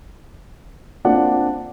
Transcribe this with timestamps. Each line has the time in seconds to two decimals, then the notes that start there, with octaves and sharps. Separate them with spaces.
1.05 A#3 C4 D4 F4 F#5